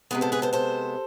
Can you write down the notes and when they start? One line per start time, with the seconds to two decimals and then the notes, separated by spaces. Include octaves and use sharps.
0.11 C3 G#3 B3 G#4 B4
0.21 A4 C5
0.32 G#4 B4
0.42 A4 C5
0.53 A4 C5